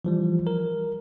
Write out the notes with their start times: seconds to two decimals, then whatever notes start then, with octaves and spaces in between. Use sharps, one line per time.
0.05 E3 F3 G3
0.47 A#4